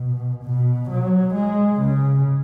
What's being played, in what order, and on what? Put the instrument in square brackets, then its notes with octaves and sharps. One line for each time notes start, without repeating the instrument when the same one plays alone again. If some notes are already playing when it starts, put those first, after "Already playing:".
Already playing: [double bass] B2
B2
F#3
G#3
C#3